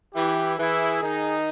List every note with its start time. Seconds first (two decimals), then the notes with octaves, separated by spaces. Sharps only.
0.15 E3 E4 G4
0.59 E3 E4 G#4
1.02 D#3 D#4